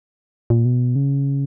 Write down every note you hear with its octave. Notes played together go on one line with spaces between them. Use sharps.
A#2
B2
C#3